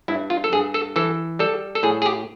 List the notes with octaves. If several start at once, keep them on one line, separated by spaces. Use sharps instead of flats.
G2 E4
F4
A4
G2 G#4
A4
E3 A4
G3 A4
A4
A2 G#4
G#4
G4